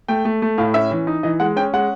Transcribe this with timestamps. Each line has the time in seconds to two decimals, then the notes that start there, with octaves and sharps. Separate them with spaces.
0.08 A3 G5
0.25 A3
0.42 A3
0.58 A2 F5
0.74 C#4 E5
0.91 E3
1.07 D#4
1.23 E3 D#5
1.40 G#3 F#5
1.56 C#4 G5
1.73 G#3 F#5